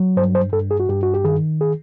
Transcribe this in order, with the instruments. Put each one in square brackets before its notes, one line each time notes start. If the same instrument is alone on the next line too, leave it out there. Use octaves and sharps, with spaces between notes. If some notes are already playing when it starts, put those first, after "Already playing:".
Already playing: [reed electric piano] F#3
G2 C5
C5
G2 A4
G#4
F#4
G2 G4
F#4
G4
D#3 G#4
G#4